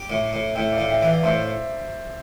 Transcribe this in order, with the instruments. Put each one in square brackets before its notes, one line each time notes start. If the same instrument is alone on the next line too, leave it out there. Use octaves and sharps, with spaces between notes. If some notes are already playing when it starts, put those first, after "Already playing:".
Already playing: [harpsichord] G4
A2
A2
[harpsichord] A2 [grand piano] E5 G5
[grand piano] D5 F5
[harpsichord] A2
[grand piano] E5 G5
[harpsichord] E3
[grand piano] D5 F5
[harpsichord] A2 [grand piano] C5 E5